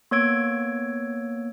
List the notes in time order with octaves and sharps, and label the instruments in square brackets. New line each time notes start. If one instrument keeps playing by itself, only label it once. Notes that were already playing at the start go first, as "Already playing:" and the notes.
[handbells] A#3 B3 C#5 E6 G#6 D7